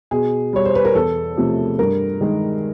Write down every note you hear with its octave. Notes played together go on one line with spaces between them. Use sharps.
B2 G#4
G3 C#5
C5
B4
A#4
E2 A4
C3 F3 A3
G2 A#4
D#3 G#3